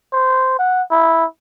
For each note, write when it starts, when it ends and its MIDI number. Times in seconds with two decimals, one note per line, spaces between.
0.13 0.55 72
0.59 0.83 78
0.91 1.25 64